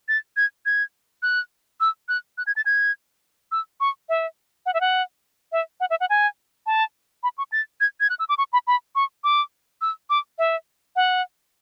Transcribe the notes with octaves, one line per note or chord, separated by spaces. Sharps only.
A6
G#6
G#6
F#6
E6
F#6
F#6
G#6
A6
G#6
E6
C#6
E5
F#5
E5
F#5
E5
F#5
E5
F#5
G#5
A5
B5
C#6
A6
G#6
G#6
F#6
E6
D6
C#6
B5
B5
C#6
D6
E6
D6
E5
F#5